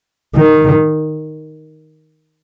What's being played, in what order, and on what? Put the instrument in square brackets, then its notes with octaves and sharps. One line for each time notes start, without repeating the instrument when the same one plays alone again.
[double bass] D#3